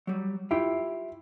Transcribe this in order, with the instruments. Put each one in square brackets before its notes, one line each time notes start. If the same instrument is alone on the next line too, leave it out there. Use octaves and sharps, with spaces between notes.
[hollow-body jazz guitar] F#3 G3
[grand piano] E4 [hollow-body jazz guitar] F4 G4 G5